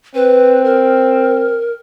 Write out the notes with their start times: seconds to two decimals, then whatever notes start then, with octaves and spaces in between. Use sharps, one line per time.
0.15 C4 B4
0.65 A#4